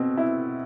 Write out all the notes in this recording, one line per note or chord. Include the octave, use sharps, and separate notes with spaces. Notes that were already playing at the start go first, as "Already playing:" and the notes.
Already playing: B2 C4
E4